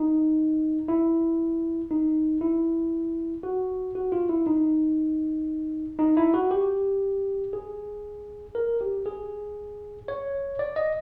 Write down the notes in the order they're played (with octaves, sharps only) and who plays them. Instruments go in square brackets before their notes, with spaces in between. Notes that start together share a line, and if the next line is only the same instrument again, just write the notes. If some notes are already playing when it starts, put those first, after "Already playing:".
Already playing: [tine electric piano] D#4
E4
D#4
E4
F#4
F#4
F4
E4
D#4
D#4
E4
F#4
G4
G#4
A#4
G4
G#4
C#5
D5
D#5